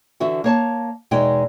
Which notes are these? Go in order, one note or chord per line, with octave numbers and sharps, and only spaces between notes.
D3 E3 F#4 E5
A#3 C#5 A5
E2 B2 G#3 D#4 G5